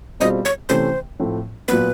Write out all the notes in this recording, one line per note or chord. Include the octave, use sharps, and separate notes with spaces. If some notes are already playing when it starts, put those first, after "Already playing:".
B2 G3 C4 F4 G#4 D#5
C#5
C3 E3 A3 C#4 C5
A2 F3 A3 C4
A#2 F#3 B3 B4